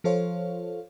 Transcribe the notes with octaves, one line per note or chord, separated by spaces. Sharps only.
F3 F4 A4 C5 C#5 F5